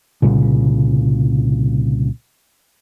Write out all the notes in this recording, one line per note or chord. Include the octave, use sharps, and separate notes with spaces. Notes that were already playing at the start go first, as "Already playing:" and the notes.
C2 A#2 C#3